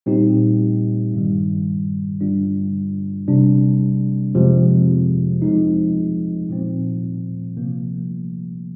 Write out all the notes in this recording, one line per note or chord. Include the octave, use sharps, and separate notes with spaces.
A#2 G3 C4 D#4 G4
G2 D#3 G3
G2 D3 G3 D4 F4
C3 G3 D4
F2 C3 F3 G#3 C4
F3 G#3 C4 D#4
A#2 F3 C4
C3 F3 A#3